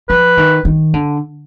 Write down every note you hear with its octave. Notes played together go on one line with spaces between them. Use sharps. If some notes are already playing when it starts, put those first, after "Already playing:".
F3 B4
D#3
D#3
D3